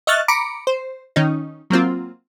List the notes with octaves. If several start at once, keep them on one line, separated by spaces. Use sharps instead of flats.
D#5 E5 C#6 F6 F#6 A6
A#5 B5 D6 C#7 D7
C5
D#3 C#4 D#4
F#3 A#3 C4 F4